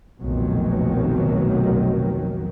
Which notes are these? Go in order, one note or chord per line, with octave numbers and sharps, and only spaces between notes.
F1 B1 A#2 D#3 F#3